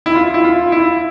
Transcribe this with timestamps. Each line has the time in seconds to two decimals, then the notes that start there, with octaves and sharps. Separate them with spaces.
0.06 E4
0.15 F4
0.34 E4
0.44 F4
0.72 E4